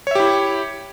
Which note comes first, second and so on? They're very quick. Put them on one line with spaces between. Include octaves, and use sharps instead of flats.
C#5 E5 G4 E4